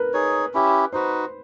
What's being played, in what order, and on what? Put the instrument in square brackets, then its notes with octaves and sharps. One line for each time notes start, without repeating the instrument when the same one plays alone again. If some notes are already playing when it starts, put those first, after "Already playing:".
Already playing: [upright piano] A#4 B4
[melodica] D#4 G#4 C#5
C#4 E4 G4
[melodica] D#4 F#4 B4 [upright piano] C5